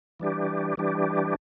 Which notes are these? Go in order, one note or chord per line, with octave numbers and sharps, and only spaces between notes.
E3 G3 D4 G4
E3 G3 D4 G4